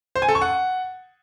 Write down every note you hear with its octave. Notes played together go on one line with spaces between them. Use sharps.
C5
G#5
A4
C#6
F#5